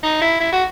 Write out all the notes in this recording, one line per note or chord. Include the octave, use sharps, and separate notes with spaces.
D#4
E4
E4
F#4